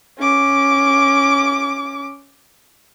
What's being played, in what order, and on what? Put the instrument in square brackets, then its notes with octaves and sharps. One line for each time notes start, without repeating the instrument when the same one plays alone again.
[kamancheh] C#4 D6